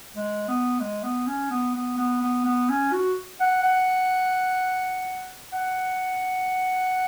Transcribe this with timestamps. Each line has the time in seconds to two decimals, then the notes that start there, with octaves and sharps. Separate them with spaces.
0.16 G#3
0.48 B3
0.80 G#3
1.03 B3
1.27 C#4
1.50 B3
1.74 B3
1.97 B3
2.21 B3
2.45 B3
2.69 C#4
2.93 F#4
3.40 F#5
3.63 F#5
5.52 F#5